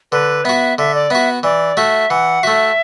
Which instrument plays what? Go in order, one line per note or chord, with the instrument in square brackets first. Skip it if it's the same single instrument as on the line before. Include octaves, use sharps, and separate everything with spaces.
[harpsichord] D3 [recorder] B4
[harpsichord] B3 F#4 [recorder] E5
[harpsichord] D3 [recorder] E5
[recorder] D5
[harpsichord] B3 F#4 [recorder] E5
[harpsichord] E3 [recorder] D5
[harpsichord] A3 F#4 [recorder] E5
[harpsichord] E3 [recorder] F#5
[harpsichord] A3 F#4 [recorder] E5